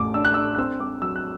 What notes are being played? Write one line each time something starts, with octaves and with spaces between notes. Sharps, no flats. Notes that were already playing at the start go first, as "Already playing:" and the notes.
Already playing: A1 A2 D6
D4 E6
F#6
D4 E6
F#6
C4 E6
C4 D6
F#3 E6
F#6